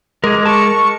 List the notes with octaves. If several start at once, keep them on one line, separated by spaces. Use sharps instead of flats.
G#3 G#4 A#4 D6
A#4 A5 C#6